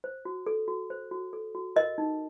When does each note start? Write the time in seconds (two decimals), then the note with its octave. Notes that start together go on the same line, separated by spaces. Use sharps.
0.04 C5
0.25 F#4
0.46 A4
0.68 F#4
0.90 C5
1.11 F#4
1.33 A4
1.55 F#4
1.76 A#4 D#5
1.98 D#4